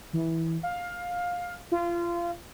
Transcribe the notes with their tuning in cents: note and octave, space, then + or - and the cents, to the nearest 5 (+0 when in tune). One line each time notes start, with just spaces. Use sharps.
E3 -15
F5 +15
F4 -25